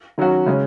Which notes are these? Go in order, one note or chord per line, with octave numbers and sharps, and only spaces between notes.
D#3 F#3 C#4 F#4
C#3 G#3 C#4